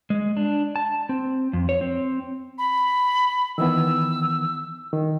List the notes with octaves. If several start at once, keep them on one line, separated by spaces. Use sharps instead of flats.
G#3
D4
A5
C4
F2
C#5
C4
B5
D#3 E3 B3 E6
D#3